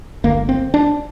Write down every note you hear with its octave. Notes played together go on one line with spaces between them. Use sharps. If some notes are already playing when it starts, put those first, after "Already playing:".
G1 G2 D3 A#3
C4
D4